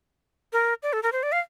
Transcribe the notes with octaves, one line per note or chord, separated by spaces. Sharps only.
A#4
D5
A4
A#4
C5
D5
F5